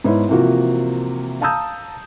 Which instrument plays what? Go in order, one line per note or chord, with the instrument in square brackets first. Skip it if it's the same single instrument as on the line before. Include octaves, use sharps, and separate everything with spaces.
[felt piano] G#2 B3 E4 C#5
C3 E3 F3 A#3 F4 F#4
F5 A5 A#5 D#6 E6 G6